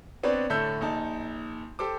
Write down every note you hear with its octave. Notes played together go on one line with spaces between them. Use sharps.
B3 C4 D4 B4 C#5 D5
A2 D3 A4 C#5 E5 G6
A#1 D#4 A5
G4 A4 C5 D6